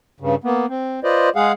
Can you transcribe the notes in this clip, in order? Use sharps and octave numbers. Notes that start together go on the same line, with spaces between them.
G2 C#3
A#3 B3
C4
F4 B4 C5 D5 D#5
G#3 G#4 F5 F#5